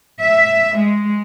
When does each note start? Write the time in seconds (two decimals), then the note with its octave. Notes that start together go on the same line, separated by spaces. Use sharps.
0.19 E5
0.77 G#3